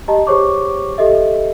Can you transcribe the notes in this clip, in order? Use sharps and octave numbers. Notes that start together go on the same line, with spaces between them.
G4 D#5 A5 A#5
G4 G#4 C5 C#5 C#6 D6
G4 A4 D#5 E5